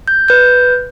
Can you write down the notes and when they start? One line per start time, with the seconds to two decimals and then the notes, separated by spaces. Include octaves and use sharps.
0.08 G6
0.28 B4 G6